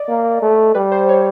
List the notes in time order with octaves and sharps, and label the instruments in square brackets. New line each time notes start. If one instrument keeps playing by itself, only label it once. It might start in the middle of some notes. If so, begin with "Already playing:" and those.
Already playing: [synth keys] D5 D#5
[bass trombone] A#3
A3
[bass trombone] G3 [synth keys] B4
[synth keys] C5
C#5